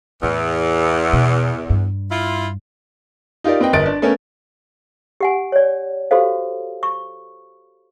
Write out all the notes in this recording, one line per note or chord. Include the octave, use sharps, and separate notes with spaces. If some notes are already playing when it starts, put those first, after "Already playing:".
E2 A2
B2
G2
E4 F4
D#4 F4 G4 A#4 D5
C4 B4 D#5 G5
G1 A#4 D#5 A6 D7
D4
A3 B3 C#4 A#4
G4 F#5 G#5
C#5 D5
F#4 G4 A4 C5 F5
C#6